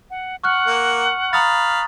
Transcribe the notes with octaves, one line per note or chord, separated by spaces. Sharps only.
F#5
F#5 C#6 F6 F#6
A#3
F5 A#5 B5 D#6 A6